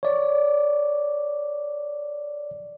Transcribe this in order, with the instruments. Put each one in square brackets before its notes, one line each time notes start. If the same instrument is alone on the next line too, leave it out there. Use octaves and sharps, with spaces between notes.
[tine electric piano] C#5 D5